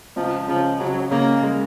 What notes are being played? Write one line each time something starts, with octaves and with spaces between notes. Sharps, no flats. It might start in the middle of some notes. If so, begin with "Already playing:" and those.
C#2 F3
C#3 F3
C#3 F#3
C#3 A#3
G#3